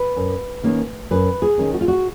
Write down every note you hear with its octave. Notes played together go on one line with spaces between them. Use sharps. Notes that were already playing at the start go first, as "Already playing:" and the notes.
Already playing: B4
F#2
D#3 A#3 C#4
F#2 B4
G#4
D#3 G#3 C#4
F#4
F4
F#4